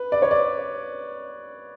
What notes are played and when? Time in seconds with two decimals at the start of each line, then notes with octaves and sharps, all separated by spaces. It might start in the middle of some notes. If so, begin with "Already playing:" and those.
Already playing: B4
0.12 D5
0.22 C#5
0.31 D5